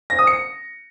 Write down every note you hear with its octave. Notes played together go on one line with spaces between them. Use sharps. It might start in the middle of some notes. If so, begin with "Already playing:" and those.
A#6
D#6
C#7